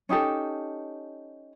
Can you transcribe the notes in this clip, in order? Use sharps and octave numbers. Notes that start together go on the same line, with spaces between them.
C#4 D#4 G4 A4